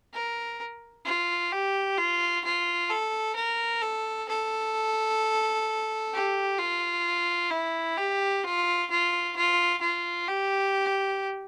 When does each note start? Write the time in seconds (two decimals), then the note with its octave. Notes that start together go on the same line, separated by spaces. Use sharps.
0.13 A#4
1.05 F4
1.52 G4
1.98 F4
2.44 F4
2.90 A4
3.36 A#4
3.82 A4
4.29 A4
6.13 G4
6.59 F4
7.51 E4
7.97 G4
8.44 F4
8.90 F4
9.36 F4
9.81 F4
10.28 G4